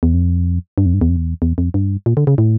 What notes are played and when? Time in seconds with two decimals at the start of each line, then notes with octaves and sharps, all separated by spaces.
0.03 E2
0.14 F2
0.78 G2
0.86 F2
0.94 G2
1.01 E2
1.10 F2
1.16 E2
1.42 E2
1.58 F2
1.74 G2
2.06 A#2
2.17 D3
2.27 C#3
2.38 A2